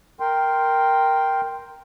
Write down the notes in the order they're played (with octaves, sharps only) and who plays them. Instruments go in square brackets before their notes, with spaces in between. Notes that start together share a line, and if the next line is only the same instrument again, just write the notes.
[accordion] A#4 G5 C6